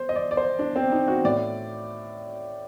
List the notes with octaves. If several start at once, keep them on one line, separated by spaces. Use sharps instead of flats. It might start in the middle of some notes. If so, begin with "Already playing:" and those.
Already playing: C5
D#5
D5
D5
C5
D4
C4
D#4
F#4
A2 D5